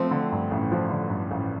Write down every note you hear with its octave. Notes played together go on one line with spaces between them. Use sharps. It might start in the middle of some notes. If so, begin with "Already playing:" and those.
Already playing: F3 A3 C4
D3
G2
A1
F3
D3
G2
A1